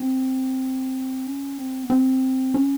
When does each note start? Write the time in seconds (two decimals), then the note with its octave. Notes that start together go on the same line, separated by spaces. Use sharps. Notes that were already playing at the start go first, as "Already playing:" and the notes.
Already playing: C4
1.27 C#4
1.58 C4
1.83 B3
1.90 C4
2.54 C#4